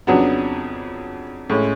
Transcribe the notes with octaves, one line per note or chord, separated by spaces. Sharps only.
F2 C#3 F#3 B3 D4
A2 G#3 C#4